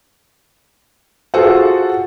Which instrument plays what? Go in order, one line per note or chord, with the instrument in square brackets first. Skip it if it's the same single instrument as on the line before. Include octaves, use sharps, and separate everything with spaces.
[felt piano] F4 F#4 G#4 A4 C5 F#5